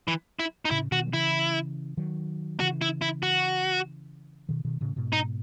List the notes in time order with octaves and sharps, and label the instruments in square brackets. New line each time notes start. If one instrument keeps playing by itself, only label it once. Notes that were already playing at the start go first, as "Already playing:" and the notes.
[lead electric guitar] E3
E4
D#4
[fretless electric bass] A2 C#3 [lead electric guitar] E4
[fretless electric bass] B2 D#3 [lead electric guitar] F#4
[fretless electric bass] F#3
[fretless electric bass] C#3 E3 [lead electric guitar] E4
[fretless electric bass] D#3 F#3
[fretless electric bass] C#3 E3 [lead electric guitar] F#4
[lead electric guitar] E4
E4
F#4
[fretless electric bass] B2 D#3
B2 D#3
A2 C#3
G#2 B2
[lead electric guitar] D#4